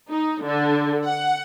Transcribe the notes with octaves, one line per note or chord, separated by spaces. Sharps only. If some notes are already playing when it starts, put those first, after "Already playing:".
D#4
D3
F#5